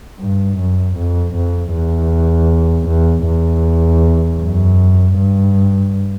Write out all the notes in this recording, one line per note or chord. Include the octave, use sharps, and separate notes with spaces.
G2
F#2
F2
F2
E2
E2
E2
F#2
G2